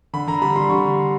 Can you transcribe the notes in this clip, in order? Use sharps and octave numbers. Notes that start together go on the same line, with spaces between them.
D3 B5
D3 A#5
G3 B5
G3 C6
D3 C#6